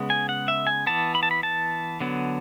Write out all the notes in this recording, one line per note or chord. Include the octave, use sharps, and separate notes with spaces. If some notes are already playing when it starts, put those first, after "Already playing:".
Already playing: C#3 G#3 B3
G#5
F#5
E5
G#5
E3 B3 A5
B5
A5
B5
A5
D3 F#3 B3